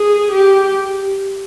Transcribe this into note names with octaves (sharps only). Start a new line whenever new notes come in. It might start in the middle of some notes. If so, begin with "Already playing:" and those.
Already playing: G#4
G4